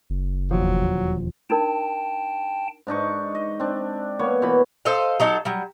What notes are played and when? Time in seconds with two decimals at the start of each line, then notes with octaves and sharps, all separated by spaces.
0.10 F#1
0.51 E1 D#2 F3 F#3
1.50 D4 D#4 A#4 G5 A5
2.87 G#2 D4 D#4 C#6
3.35 D#5
3.60 C4 D4
4.19 A#3 B3 C#5
4.42 B2 E3 F#5 B5
4.85 A4 C5 D#5 F5
5.20 F#3 D#4 A4
5.45 F#3 G3